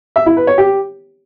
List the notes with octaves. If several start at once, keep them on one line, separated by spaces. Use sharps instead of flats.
E5
E4
B4
C#5
G4